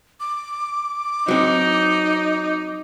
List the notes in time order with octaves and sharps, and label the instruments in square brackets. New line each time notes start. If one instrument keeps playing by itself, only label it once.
[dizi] D6
[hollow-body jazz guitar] F#3 C4 [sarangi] D#4